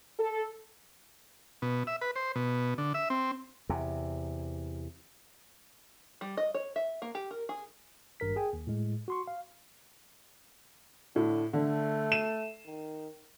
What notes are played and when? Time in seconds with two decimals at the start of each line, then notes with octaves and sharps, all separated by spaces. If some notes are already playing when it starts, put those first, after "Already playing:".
0.19 A4
1.62 B2
1.87 E5
2.01 B4
2.16 C5
2.36 B2
2.78 D3
2.94 E5
3.10 C4
3.69 E2 C3
6.21 G3
6.37 D#5
6.54 C#5
6.76 E5
7.02 A#3
7.15 G4
7.31 A#4
7.49 G#4
8.20 G#1 G2 A#4 B6
8.36 G#4 G5 G#5
8.53 D#2
8.67 A2 G#3
9.08 F#4 C6 C#6
9.28 F5
11.16 A2 D3
11.53 D3 A3
12.12 D#7 E7
12.66 D#3